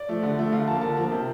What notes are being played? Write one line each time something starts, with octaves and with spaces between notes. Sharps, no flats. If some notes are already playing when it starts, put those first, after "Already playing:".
Already playing: D5
F3 A3
D3
F3 A3
D3 F5
F3 A#3 A5
D3 A5
F3 A#3
C3